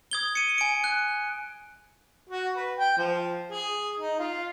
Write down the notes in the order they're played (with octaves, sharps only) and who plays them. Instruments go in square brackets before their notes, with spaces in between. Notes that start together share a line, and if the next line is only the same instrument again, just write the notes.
[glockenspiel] D#6 G#6 G7
C#7 D#7
G#5 D7
F#6
[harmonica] F#4
B4
G5
F3
G#4
D#4
F4